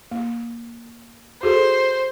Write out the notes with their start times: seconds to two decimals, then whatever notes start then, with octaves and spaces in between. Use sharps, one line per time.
0.11 A#3
1.43 F#4 G#4 A4 C5